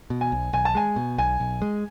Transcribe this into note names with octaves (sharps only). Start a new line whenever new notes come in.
B2
G#5
B1
B1 G#5
A5
G#3 G#5
B2
B1 G#5
B1
G#3